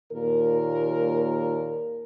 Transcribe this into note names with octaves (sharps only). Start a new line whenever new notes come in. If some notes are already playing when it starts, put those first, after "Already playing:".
D#2 A#2 A#4